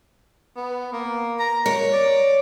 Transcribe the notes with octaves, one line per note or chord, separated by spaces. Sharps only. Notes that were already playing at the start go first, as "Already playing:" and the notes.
B3
A#3
A#5
A#4 C#5
D5